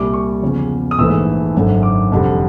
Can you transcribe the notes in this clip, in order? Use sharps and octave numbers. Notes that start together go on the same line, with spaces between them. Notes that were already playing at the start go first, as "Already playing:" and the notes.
Already playing: C2 A#2 G3 D6
C#6
E2 C#3 F3
D#6
A#1 G#2 E3 A3 E6
G#1 F#2 D3
D6
F1 F2 D3 G3